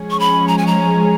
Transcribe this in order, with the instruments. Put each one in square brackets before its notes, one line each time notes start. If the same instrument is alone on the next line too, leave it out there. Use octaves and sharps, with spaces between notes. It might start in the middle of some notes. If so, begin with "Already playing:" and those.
Already playing: [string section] F3 G#3 C#4 G#4
[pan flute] C#6
B5
A#5
G#5
A#5